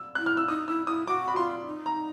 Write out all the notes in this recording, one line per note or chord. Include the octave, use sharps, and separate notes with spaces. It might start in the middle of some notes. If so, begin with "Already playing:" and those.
Already playing: E6
E4 F#6
F6
E6
D#4 D#6
E4 E6
E4 D#6
F#4 D6
B5
F4 C6
D#4
A#5